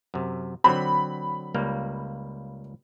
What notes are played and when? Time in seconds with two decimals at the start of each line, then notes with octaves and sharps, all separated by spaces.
0.14 F#2 C3
0.64 D3 F#3 C4 B5
1.54 C#2 G3 A#3